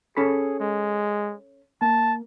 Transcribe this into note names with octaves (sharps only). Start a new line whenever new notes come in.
C#4 G#4 A4 B5
G#3
A#3 A5